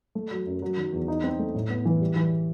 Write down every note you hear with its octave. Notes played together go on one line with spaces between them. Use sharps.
A3
F#3
F#2
F#3
D#3
E2
D#4
C4
A3
A2
B3
E3
G3
E3